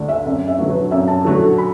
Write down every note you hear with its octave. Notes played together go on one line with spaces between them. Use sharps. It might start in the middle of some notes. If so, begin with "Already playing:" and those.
Already playing: D2 D3 A3 D4
E5
F#2 E5
E5
D3 F#3 A3 F#4
B4
F#2 E5
A5
D3 F#3 A3 F#4 A4
A4
B5